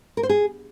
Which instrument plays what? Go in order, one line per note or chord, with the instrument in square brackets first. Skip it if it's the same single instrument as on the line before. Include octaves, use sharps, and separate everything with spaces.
[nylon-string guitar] A#4
C5
G#4